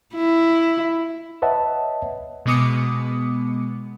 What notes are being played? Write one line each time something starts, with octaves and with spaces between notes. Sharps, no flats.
E4
B4 C#5 D#5 E5 F#5 A5
B2 G#3 B3 D6 D#6 C#7